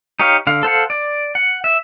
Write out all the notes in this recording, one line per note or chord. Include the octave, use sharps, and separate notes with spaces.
D#4 G4 C#5 F5
D3 F5
A4 C5 F5 F#5
D5
F#5
E5